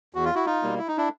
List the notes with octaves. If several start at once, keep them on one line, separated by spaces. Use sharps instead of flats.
E2 F#4
F4
E4 F#4
D#4 F4
B2 G3 A#3
E4
D#4
D4 E4